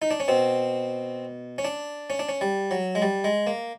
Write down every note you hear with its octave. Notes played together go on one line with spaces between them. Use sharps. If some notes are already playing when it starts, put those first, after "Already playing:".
D#4
D4
C#4
B2 C4
C#4
D4
C#4
D4
C#4
G3
F#3
G#3
G3
G#3
A#3